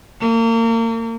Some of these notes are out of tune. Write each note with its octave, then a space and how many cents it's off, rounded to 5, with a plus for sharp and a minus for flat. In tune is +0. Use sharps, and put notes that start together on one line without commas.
A#3 -35